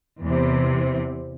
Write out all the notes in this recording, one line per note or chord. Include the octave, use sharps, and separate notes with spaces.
E2 C3